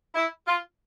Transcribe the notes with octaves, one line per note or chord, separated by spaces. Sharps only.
E4
F4